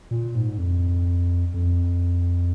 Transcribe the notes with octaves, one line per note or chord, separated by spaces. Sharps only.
A#2
G#2
F2
F2